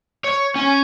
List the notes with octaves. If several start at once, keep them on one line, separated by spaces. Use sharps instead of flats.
C#5
C#4